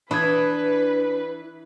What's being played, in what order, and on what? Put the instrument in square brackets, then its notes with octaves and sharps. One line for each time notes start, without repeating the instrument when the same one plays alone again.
[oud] E3 [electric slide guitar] D4 [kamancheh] B4 [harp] B5 D#6 G#6